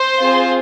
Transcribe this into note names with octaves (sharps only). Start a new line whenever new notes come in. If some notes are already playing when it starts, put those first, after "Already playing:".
Already playing: C5 C6
C4 F4 G#4